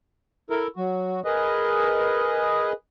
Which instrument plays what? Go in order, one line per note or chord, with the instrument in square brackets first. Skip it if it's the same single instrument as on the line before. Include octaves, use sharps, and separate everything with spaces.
[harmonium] E4 A4 A#4
[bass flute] F#3 [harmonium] F#4
[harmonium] G#4 B4 D#5 [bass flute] A#4